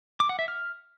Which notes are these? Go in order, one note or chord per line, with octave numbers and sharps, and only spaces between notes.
D6
F#5
E5
F6